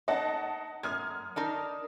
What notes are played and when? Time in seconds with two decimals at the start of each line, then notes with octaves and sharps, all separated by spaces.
0.08 D#4 D#5 F#5 A5
0.83 F#2 D#6 F6 G#6
1.36 D4 D#4 A#4